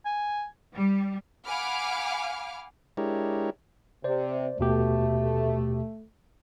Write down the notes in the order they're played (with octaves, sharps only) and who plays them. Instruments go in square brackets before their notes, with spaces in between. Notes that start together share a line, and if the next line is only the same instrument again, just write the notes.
[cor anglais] G#5
[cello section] G3
[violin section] F5 F#5 G#5 B5 D6 F6
[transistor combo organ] G#3 D4 E4 G4 A#4 C#5
[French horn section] C3 [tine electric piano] C5 D5
[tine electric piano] D#2 B2 G4 [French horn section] A3